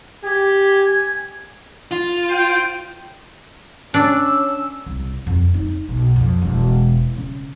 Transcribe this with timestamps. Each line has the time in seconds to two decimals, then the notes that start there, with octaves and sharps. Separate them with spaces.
0.24 G4 G#5
1.91 F4
2.29 C5 G5
3.94 C#4 D4 E6
4.86 C2
5.27 F2
5.54 D#4
5.89 B1
6.16 F2
6.42 E1
7.17 C#3